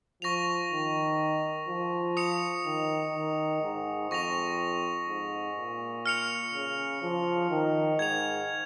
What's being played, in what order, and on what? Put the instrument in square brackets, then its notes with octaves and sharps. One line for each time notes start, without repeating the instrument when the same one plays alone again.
[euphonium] F3 [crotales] C#6 A#6 F7
[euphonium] D#3
F3
[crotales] D#6 C#7 F7
[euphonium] D#3
D#3
G#2
[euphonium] F2 [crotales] C#6 A#6 F7
[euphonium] G#2
A#2
[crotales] F6 C#7 F7
[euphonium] C#3
F3
D#3
[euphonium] G#2 [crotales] G#6 F7